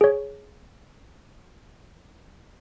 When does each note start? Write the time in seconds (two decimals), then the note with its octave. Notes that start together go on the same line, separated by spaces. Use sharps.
0.01 G#4 C#5